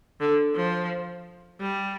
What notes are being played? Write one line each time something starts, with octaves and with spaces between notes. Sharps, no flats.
D3
F3
G3